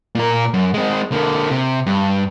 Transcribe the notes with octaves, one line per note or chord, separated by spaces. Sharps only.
A#2 A#4
F#2
G#3 C4
D3 A#3
C3
G2